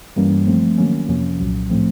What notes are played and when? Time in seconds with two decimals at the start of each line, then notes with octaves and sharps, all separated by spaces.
0.16 G2 E3 G3 A#3 C#4
0.47 F3 A3 C4
0.78 D#3 F#3 A#3 C#4
1.08 F2 C3 F3 A#3 C#4
1.40 C2 A#2 F#3
1.70 A2 F3 A3 C4